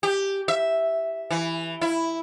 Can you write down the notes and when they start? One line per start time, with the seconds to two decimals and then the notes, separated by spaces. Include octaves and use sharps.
0.03 G4
0.48 E5
1.30 E3
1.81 E4